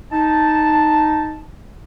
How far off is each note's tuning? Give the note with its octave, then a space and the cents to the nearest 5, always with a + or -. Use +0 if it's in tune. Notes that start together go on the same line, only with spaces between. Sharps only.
D#4 +0 A5 +0